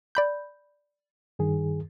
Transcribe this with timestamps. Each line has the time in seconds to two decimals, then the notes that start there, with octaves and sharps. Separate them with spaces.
0.15 D5 B5 G6
1.39 G2 D#3 G#4